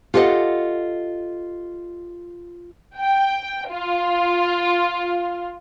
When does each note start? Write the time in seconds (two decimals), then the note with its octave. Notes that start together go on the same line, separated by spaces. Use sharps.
0.14 F4 G4 A4 A#4 D#5 F#5
2.99 G5
3.69 F4